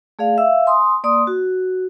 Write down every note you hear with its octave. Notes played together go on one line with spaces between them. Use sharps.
A3 G#4 D5 F5
E5 F5 E6
G#5 C6 D#6
A#3 D5 C6 D#6
F#4